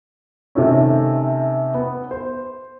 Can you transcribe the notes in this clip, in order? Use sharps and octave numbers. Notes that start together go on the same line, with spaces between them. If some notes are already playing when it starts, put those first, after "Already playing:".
C3 D#3 A3 C#4
B3
C5